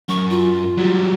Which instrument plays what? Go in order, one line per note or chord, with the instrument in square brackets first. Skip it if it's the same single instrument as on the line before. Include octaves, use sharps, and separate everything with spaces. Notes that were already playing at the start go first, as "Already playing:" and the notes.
[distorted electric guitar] F#2 [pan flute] C#6
[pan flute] F4
[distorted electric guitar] F#3 G3